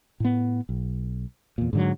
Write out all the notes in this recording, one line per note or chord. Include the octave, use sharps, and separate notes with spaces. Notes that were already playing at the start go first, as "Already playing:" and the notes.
A2 B3
B1
E2 A#2
G#2 D3 F#3